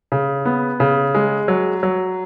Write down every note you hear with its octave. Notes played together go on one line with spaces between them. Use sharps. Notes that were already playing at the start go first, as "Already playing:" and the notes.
C#3
B3
C#3
G#3
F#3
F#3